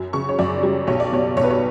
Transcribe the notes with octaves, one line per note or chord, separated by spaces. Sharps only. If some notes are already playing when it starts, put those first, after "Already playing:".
Already playing: F#2 F#3
C#3 C#6
C#5
F#2 D5
G3
B1 C#5
D5
B2 C#5
B1 C#5
B4
C#5